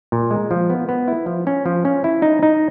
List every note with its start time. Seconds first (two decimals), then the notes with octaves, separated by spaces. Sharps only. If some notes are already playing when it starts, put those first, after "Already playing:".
0.12 A#2
0.31 G#3
0.51 F3
0.70 B3
0.89 B3
1.08 E4
1.26 F3
1.47 C#4
1.66 F3
1.85 C#4
2.04 E4
2.22 D#4
2.43 D#4